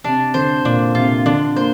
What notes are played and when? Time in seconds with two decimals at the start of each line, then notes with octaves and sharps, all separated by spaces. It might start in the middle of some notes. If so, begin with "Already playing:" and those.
0.04 C3 D4
0.34 D3 C5
0.64 A#2 D4
0.95 C3 F4
1.26 D3 D4
1.56 A#3 C5